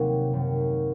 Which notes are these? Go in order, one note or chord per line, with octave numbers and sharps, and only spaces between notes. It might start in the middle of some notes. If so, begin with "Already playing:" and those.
Already playing: D#2 C3 D#3 F#3 A#3 C4
F#2 D#3 F#3